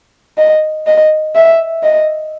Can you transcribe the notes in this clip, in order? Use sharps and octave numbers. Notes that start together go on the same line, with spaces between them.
D#5
D#5
E5
D#5